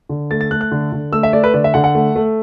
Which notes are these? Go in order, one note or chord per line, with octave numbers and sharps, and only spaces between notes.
D3
A3 A6
A6
A3 F#6
F#6
D3
D3
A3 E6
E5
A3 D5
B4
D3 D5
E5
D3 F#5
F#5
A3
A3